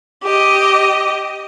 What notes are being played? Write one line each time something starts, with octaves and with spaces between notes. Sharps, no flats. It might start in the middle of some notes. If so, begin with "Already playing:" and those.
G4 D#5